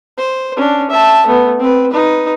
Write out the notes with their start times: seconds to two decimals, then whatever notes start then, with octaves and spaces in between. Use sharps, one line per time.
0.18 C5
0.57 C#4 D4
0.90 E5 A5
1.26 A3 B3
1.60 C4 B4
1.91 D#4 B4